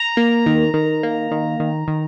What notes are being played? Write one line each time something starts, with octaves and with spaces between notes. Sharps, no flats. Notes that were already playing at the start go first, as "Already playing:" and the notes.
Already playing: A#5
A#3
D#3
D#3
A#3
D#3
D#3
D#3